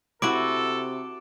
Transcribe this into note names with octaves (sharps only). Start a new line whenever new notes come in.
C3 E4 F#4 A4 D6 D7